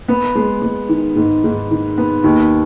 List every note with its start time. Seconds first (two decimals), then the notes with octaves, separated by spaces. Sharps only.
0.08 B3
0.35 G#3
0.62 G#3
0.89 D#3
1.16 G#2
1.44 G#2
1.71 D#3
1.98 B3
2.24 D#2